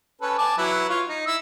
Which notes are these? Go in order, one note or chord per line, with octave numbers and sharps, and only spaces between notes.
C#4 A4 B4
G#5 A5 D6
F#3 E4 B4
F4 C#5
D#4
E4 E6